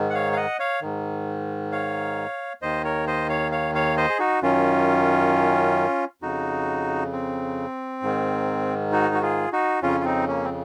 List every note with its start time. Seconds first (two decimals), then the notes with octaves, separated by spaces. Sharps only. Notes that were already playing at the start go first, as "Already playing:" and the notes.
Already playing: G#2 D#3
0.10 F#5
0.14 C#5 F5
0.33 F5
0.36 D#5 F#5
0.59 C#5 F5
0.81 G#2 D#3
1.72 C#5 F5
2.62 D#2 D#3 C5 D#5
2.84 A#4 C#5
3.07 C5 D#5
3.29 C#5 F5
3.52 C#5 F5
3.75 C#5 F5
3.97 C5 D#5
4.10 G#4
4.19 D#4 F#4
4.42 F#2 D#3 C#4 F4
6.22 F2 C#3 D#4 F#4
7.12 C4
8.02 G#2 D#3
8.92 D#4 F#4
9.14 F#4
9.22 F4 G#4
9.52 D#4 F#4
9.82 F2 C#3 C#4 F4
10.00 F4
10.05 C4 D#4
10.27 A#3 C#4
10.44 C4